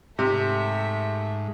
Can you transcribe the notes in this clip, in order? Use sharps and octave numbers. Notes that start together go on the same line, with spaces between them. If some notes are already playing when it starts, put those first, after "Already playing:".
G#2 C3 A3 E5